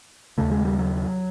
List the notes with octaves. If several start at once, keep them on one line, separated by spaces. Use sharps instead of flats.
D#2 C#3 A3
G#3
G3
F#3